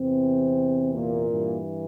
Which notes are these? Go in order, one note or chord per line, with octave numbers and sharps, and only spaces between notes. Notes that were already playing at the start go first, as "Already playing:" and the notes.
Already playing: E2 C3 E3 C4
A#2 A#3
G2 E3